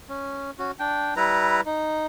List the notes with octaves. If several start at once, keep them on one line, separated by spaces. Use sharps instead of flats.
C#4
C#4 F#4
D4 G5
G3 E4 B4 A#5
D#4